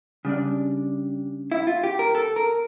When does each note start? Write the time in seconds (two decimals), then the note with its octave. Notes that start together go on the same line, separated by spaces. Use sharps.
0.25 C#3 G3 D4
1.52 E4
1.67 F4
1.83 G4
1.99 A#4
2.15 A4
2.36 A#4